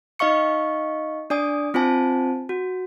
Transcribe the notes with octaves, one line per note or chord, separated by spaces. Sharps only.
D#4 D#5 F5 C#6 C#7
D4 D5 G#5 D#6
C4 F4 C5 G#5 A5
F#4